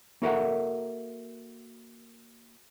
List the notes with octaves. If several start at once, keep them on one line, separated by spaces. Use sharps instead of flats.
A#3 F#4 A4 A#4 E5 F#5